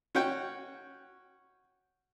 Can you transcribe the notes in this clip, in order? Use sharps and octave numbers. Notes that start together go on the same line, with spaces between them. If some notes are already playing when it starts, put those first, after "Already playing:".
C#4 F#4 G5